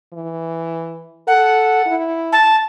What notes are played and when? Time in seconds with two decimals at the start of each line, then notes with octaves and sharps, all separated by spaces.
0.14 E3
1.28 A4 F#5
1.87 E4
2.32 A5